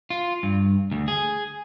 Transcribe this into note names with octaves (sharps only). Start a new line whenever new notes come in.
F4
G2
D2
G#4